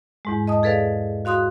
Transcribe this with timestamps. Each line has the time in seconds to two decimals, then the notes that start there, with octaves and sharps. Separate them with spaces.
0.25 E2 G#2 G#3
0.47 D#5 A5 D#6
0.63 G#4 A4 B4 D5 F5
1.25 F#4 F5 C6 D#6 F#6